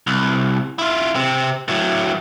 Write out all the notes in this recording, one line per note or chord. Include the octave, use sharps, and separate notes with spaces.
C2
E4 F4
C3 C4
A2 F#3